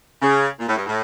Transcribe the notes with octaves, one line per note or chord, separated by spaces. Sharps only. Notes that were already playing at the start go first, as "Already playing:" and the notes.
C#3
A#2
A2
G2
A2